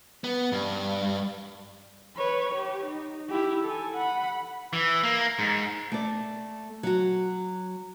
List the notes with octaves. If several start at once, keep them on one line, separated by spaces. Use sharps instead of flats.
B3
G2
B4 C#5
G4
D#4
E4 G4
A4 G#5
F#5 B5
E3
A#3
G#2
A3 D5
F#3 F#4